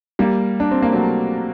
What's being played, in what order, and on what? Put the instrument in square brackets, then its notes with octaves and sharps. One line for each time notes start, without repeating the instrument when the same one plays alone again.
[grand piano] G3 A#3
D4
C4
A#3
F#3 A3